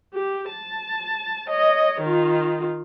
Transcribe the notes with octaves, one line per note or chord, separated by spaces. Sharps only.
G4
A5
C#5 D#5
D#3 F4